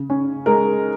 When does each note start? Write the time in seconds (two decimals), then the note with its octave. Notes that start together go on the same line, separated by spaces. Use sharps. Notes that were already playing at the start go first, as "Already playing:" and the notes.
Already playing: C#3
0.10 C#4
0.46 G#3 A#4